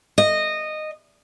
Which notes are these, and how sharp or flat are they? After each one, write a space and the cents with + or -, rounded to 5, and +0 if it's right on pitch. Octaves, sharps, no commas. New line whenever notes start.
D#5 -15